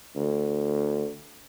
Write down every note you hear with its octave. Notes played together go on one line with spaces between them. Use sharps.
D2